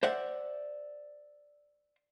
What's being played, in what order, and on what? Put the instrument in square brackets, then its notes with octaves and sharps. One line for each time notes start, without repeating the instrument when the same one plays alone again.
[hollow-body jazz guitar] C5 D5 E5 F#5